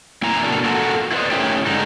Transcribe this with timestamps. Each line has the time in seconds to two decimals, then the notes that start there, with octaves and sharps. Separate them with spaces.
0.22 A#3 E4 G#5 A#5
0.43 B2 A3 A#3 D4
0.65 F4 F#4 A4 A#4
1.12 E4 F4 B4 C5 D5 D#5
1.31 A2 D#3 G#3 C#4 E4 G4
1.66 G#2 D3 D#4